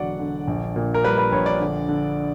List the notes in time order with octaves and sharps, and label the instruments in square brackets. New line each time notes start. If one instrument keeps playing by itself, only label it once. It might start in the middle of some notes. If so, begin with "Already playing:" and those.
Already playing: [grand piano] E1 D3 F#3 D5 F#5
D3
A#1
A#2
A#4
G3 B4
B4
A#1 C#5
D5
D3
D3